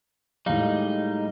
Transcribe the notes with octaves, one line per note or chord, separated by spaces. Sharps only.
A2 G3 G#3 D#4 F5